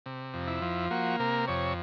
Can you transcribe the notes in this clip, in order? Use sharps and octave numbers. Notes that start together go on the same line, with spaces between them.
C3
F2
E4
F3
A#3 F#4
C3 A#4
F2 C#5